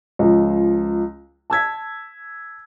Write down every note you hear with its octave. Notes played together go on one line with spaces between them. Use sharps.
C#2 F3
A5 E6 G#6 B6